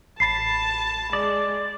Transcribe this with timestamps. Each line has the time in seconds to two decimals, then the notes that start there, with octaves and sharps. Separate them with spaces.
0.20 A1 A5 B5 A6 C7
1.13 G#3 D5